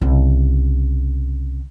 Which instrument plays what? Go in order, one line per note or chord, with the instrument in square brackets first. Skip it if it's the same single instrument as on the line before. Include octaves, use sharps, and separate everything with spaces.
[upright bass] C2 C#3